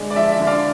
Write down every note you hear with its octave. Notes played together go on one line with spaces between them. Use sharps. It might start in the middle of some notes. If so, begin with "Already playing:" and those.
Already playing: D3 G#3 D4
D5
F3 E5
E5
D3
D5 F5